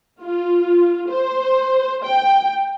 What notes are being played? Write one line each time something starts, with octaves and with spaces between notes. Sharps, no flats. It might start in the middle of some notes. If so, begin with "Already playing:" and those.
F4
C5
G5